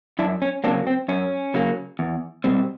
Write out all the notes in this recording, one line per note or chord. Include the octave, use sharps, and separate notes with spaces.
F#2 D4 E4
C#4
C#3 F#3 A#3 C4 D4
C4
F#2 C#4
C#3 F#3 A#3
E2
B2 G3 C4